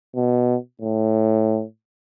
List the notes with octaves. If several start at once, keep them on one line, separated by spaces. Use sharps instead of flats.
B2
A2